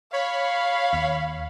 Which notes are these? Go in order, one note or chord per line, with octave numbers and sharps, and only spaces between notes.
C#5 F5 B5
D#2